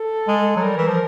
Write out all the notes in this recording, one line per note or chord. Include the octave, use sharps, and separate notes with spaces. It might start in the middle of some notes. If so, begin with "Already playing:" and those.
Already playing: A4
G#3
F#3
G3 A#4
E3
F3